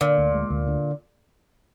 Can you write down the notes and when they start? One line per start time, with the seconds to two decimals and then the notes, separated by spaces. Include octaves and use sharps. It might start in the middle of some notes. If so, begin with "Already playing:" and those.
0.01 A#2 D3
0.18 D2
0.34 G#3
0.50 D2
0.68 D3